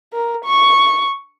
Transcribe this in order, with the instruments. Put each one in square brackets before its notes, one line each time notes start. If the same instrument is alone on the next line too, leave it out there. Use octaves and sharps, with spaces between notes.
[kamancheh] A#4
C#6